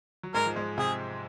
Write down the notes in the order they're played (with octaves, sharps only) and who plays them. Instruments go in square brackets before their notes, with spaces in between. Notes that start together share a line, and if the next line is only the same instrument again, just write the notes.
[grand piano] F#3
[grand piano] G#2 G#3 [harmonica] A#4
[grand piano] F3
G#2 G#3
[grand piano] C3 C4 [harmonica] G#4